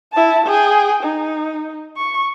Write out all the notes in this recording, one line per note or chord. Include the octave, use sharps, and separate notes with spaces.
E4 A5
G#4 G5
D#4
C#6